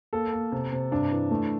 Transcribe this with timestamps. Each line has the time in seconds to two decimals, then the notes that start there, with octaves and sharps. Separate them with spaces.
0.13 A#3 A4
0.33 A#3
0.52 C3
0.72 C3
0.91 G2 D4
1.12 E3
1.31 A3